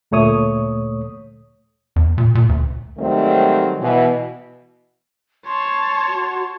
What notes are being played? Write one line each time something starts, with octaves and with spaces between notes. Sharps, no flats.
D2 A#2 A3 C#5 D#6
E2
A#2
A#2
D2
G#2 D#3 F#3 G3 A3 C4
B2 E3
C#5 A5 C6
F#4